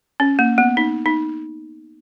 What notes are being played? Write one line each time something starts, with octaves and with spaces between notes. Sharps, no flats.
C#4
A#3
B3
D#4
D#4